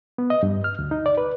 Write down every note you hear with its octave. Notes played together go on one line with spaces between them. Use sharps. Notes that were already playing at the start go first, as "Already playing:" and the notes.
B3
D#5
G2
F6
D2
D#4
D5
B4